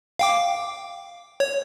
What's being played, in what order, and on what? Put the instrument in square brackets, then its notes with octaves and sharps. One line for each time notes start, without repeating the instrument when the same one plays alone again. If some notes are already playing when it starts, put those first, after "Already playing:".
[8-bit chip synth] F5 G5 D6
C#5